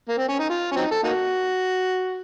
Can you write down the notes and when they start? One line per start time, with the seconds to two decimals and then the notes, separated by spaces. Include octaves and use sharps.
0.09 A#3
0.18 C4
0.29 C#4
0.39 D#4
0.50 F4
0.72 C#4
0.77 F#3 C4 D#4
0.91 A4
1.03 A#3 D#4 F#4